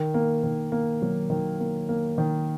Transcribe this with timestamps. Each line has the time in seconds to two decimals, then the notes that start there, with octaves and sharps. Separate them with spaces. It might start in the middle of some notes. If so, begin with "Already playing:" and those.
Already playing: D#3
0.14 A#3
0.44 D#3
0.72 A#3
1.02 F#3
1.30 D#3
1.60 A#3
1.89 A#3
2.18 D#3